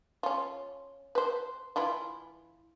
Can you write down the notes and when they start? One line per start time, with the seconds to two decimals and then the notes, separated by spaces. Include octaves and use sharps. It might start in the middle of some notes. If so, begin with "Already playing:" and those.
0.23 C#4 F4
1.15 B4 C5
1.76 E3 E4 F4